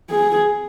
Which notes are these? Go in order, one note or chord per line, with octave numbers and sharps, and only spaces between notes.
G#4